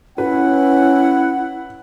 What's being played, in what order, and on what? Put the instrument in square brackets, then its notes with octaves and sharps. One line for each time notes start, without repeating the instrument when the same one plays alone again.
[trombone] C#4 [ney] E4 [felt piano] B4 [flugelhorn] F#5